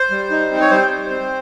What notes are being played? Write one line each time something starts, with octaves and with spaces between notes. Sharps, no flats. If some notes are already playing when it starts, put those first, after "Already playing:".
Already playing: C5
G3
D#4
C4
C#5
G3 C5
C4
C4